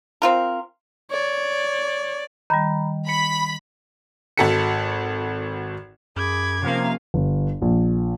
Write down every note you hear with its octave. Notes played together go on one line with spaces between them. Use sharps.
C4 F4 A#4
C#5 D5
D#3 G3 A#5 B5
B5 C#7
G#1 F#4 A4 B6 C#7
F#2 G#4 B5 D6 G#6
C3 F3 A#3 C#4 F5
G1
A#1